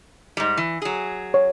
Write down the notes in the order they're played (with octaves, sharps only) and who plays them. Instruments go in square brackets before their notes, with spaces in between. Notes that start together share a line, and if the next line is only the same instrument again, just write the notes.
[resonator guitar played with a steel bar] G#2 G3
E3
F#3 G#4
[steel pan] C#5